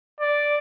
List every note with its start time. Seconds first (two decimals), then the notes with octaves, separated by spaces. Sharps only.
0.20 D5